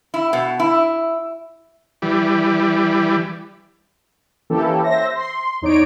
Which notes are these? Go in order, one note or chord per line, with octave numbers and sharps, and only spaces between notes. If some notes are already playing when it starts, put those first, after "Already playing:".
E4
B2
E4
E3 G3
E3 A#3 C#4 E4 G4 A4
C5 E5 A#6
C6
E2 D#4 C#5 D5 D7